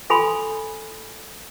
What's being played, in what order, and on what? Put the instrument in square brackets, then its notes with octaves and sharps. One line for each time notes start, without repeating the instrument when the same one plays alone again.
[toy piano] F4 A4 G#5 B5 C6